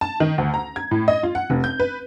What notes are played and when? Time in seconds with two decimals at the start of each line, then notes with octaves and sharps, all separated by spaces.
0.01 A5
0.20 D#3
0.38 D2
0.54 A#5
0.76 G#6
0.91 A2
1.08 D#5
1.23 F4
1.35 F#5
1.50 F1
1.64 G6
1.80 B4